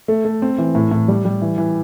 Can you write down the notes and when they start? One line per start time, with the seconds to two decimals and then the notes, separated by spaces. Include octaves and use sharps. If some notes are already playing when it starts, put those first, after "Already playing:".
0.08 A3
0.25 A3
0.42 C4
0.58 E3
0.75 A2
0.91 A2
1.08 G3
1.25 G3
1.42 E3
1.58 E3